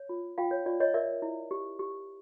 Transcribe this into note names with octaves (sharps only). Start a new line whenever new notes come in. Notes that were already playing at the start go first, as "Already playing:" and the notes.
Already playing: C#5
F4
F4 F5 G5
C#5
F4 D5
C#5 D#5
A#4 D5 E5
E4
G4
G4